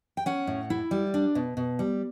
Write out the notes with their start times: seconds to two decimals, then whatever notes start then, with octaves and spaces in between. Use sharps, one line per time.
0.17 G5
0.26 C#4 F#5
0.47 A2
0.70 E4
0.91 G3
1.14 D4
1.35 B2
1.57 B2
1.79 G3